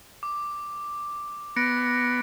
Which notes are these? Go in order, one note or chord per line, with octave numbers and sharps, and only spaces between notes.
D6
B3 A#6 C#7 D7